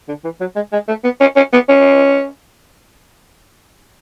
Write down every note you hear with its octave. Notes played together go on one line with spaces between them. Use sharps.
D3
E3
F#3
G#3
G#3
A3
B3
C#4
C#4
B3
C#4